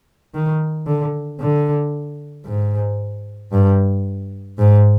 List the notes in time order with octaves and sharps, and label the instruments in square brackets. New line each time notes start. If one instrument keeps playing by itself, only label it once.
[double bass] D#3
D3
D3
G#2
G2
G#2